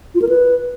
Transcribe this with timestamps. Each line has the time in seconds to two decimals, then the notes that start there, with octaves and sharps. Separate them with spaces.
0.15 F4
0.22 A#4
0.29 B4